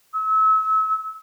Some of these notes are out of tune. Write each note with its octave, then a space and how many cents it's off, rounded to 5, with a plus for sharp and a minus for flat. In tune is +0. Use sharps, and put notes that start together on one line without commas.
E6 -35